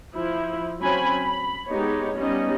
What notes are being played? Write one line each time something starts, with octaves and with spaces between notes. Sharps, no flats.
F3 E4
F#3 C4 C#4 G#5 B5
B5
G#3 B3 D#4 G4 C#5
G3 B3 C#4 D#4 D#5